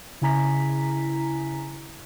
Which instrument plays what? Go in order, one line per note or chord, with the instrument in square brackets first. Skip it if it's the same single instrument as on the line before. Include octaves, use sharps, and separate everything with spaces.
[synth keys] C#3 E4 G#5 A#5 B6